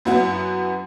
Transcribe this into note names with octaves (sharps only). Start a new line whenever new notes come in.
F#2 F#3 B3 E4 F#5